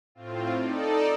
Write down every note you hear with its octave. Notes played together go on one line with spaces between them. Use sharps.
A2 C4 F4
D#4 A4 D5